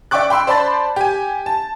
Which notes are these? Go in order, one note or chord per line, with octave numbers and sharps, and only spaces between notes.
D5 E5 G5 C#6 D6 F#6
G5 B5 C6 E6
C5 D5 A5 B5 C6 A6
G4 G#5
A5